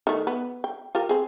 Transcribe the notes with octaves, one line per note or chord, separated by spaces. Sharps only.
D#3 A3
B3
G5
F4 G4 A#4
C4 G#4